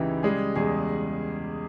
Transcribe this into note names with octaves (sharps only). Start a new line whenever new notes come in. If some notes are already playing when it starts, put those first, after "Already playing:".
Already playing: C#2 C#3 E3 D#4 E4 G4
G3 G#3 G#4
E2 G#3 G#4